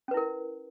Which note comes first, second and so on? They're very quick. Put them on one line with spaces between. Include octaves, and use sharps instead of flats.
C#4 B4 E4 A#4